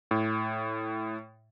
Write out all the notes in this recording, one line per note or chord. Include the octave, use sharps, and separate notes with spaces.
A2